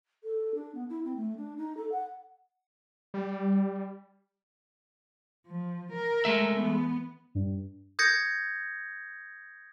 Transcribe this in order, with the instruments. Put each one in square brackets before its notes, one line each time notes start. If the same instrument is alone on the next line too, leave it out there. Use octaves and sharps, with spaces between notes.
[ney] A4
D4
B3
E4
C4
A3
D4
D#4
A4
F#5
[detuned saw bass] G3
[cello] F3
A#4
[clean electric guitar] G#3 A3 E5
[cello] E3 B3
[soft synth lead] G2
[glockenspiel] D#6 G6 G#6 A#6 C#7